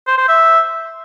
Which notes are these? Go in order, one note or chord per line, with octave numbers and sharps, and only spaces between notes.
C5
C5
E5